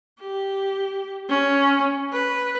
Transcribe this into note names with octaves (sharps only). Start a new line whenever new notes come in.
G4
C#4
B4